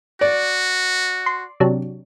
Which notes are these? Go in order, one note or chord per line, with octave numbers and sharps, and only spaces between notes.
F#4 D5
C6
C3 F#3 D4